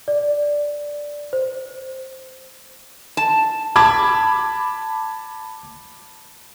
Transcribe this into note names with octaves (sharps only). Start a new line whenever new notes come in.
D5
C5
A5
A5 B5 D6 G#6